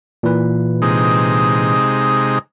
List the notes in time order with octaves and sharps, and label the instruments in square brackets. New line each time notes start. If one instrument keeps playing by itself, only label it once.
[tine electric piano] A#2 E3 B4
[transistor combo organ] C3 G#3 D#4